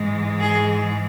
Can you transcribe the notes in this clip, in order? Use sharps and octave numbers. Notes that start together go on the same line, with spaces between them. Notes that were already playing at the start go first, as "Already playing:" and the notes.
Already playing: G#2 E3 G#3
G#4